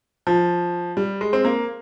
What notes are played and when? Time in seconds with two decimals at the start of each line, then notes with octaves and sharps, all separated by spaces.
0.27 F3
0.97 G3
1.21 G#3
1.33 C4
1.44 A#3